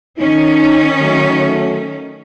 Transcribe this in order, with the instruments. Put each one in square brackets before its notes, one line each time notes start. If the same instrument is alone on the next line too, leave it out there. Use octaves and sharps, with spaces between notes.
[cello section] D#3 C#4 [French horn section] D#4
[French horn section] F#3 A3